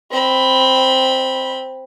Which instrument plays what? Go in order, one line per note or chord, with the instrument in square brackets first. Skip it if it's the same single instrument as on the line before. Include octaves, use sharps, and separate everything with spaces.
[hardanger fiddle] C4 B5